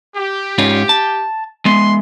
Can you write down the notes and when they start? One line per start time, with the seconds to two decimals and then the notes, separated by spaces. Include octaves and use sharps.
0.16 G4
0.58 G#2 C#4 F4
0.89 A5
1.65 G#3 B3 C6